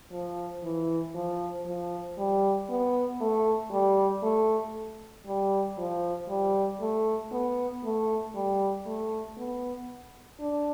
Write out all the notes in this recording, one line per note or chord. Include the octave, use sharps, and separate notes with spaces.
F3
E3
F3
F3
G3
B3
A3
G3
A3
G3
F3
G3
A3
B3
A3
G3
A3
B3
D4